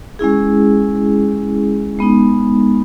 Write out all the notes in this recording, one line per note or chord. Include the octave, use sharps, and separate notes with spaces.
G#3 C#4 E4 G#4
G#3 B3 D#4